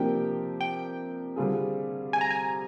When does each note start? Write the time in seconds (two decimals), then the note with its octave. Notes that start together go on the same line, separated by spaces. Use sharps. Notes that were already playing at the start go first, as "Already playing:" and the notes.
Already playing: C3 F3 A#3 D4 G4 G5
0.61 G5
1.36 D3 G3 C4 F4 G#4
2.13 G#5
2.21 A#5
2.30 G#5